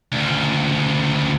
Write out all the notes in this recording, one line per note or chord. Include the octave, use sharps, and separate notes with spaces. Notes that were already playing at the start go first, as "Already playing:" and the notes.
D2 C#3